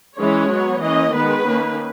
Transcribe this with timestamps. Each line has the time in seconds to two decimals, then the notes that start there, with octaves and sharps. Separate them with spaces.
0.18 E3 G#3 C#4 C#5
0.50 F#3 B3
0.82 E3 A#3 C#4 D#5
1.14 D#3 G#3 B3 B4
1.45 D#3 A#3 C#4